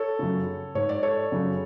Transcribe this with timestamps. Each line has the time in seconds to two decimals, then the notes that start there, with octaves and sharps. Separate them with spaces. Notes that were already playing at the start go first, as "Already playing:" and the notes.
Already playing: A4 C#5
0.19 F#2 C#3
0.75 G#2 C#5
0.89 D5
1.03 A4 C#5
1.32 F#2 C#3